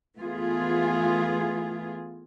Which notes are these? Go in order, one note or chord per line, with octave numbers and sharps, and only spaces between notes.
E3 A3 B3 F4 G#4